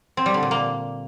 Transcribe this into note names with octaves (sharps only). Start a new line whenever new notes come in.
C4
G3
D3
A#2
A#3